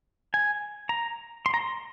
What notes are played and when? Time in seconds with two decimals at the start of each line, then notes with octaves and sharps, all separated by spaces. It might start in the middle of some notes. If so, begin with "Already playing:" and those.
0.34 G#5
0.89 A#5
1.46 C6
1.54 A#5
1.61 C6